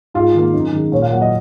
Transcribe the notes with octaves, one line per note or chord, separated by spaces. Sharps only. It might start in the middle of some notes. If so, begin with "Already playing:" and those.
G#2 F4
D#3 A#3
F#2 D#4
D#3 G#3
A#2 C#5
F5
F#3 A#3 F#5
D#5